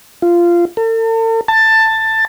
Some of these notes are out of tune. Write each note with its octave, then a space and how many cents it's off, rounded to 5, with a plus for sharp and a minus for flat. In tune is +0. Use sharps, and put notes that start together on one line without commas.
F4 -15
A4 +45
A5 +15